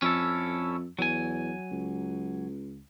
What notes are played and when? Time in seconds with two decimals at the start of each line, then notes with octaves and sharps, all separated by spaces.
0.02 F2 C#4 E4 A4
0.99 E2 F#3 G#5
1.71 C#2